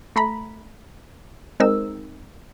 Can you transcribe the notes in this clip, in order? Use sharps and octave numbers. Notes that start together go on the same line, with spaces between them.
A3 A#5 B5
G#3 C4 D#4 A#4 E6